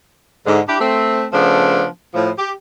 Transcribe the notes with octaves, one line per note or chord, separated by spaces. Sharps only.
G#2 D3
D4 E4 G4
A3 C4
C#3 F3 A3 B3 D4
A2 F3
G4